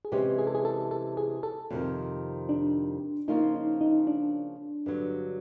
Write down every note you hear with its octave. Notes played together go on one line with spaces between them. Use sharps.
G#4
C3 E3 G#3 C#4 G4
G#4
A4
G#4
A4
A4
G#4
A4
F2 C3 D#3
D4
C#3 F3 A#3 C#4 D#4 F4
D#4
D#4
D4
G2 D3 F#3